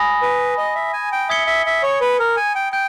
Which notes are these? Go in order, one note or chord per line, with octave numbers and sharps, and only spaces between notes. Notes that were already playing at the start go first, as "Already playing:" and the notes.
Already playing: G#5 B5 D#6 A#6
B4
D#5
E5
G#5
G5
E5 D#6 G#6 C#7 G7
E5
E5
C#5
B4
A#4
G#5
G5
G5 G6